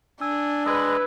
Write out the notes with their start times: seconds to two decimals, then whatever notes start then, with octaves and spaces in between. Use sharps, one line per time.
0.21 D4 G#5 E6
0.66 G#3 B4 D#5 E6 G#6